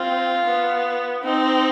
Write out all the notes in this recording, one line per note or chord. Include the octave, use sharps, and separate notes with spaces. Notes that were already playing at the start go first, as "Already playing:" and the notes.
Already playing: C4 F4
B3
C4 D#4